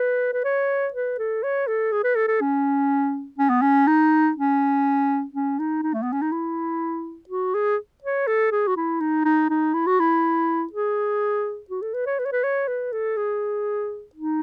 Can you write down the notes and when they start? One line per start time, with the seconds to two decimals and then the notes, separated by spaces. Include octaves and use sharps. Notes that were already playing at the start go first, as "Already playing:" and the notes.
Already playing: B4
0.33 B4
0.44 C#5
0.93 B4
1.19 A4
1.43 C#5
1.67 A4
1.92 G#4
2.04 B4
2.16 A4
2.28 A4
2.41 C#4
3.38 C#4
3.49 B3
3.62 C#4
3.87 D#4
4.37 C#4
5.34 C#4
5.59 D#4
5.83 D#4
5.94 A3
6.02 B3
6.12 C#4
6.22 D#4
6.32 E4
7.29 F#4
7.54 G#4
8.04 C#5
8.27 A4
8.52 G#4
8.67 F#4
8.77 E4
9.00 D#4
9.25 D#4
9.49 D#4
9.74 E4
9.87 F#4
10.00 E4
10.73 G#4
11.70 F#4
11.82 A4
11.94 B4
12.06 C#5
12.19 B4
12.26 C#5
12.32 B4
12.44 C#5
12.68 B4
12.92 A4
13.17 G#4
14.15 D#4